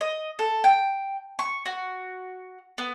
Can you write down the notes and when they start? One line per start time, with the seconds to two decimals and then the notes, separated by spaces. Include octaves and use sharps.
0.01 D#5
0.39 A4
0.64 G5
1.39 C#6
1.66 F#4
2.78 B3